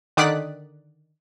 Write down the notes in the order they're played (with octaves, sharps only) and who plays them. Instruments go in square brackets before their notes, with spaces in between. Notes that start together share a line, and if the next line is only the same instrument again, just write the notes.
[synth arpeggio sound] D3 D#3 D5 D#6 F#6 B6